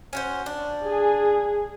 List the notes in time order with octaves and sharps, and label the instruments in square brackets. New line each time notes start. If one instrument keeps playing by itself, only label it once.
[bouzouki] C#4 F#4 C5
D4
[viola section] G#4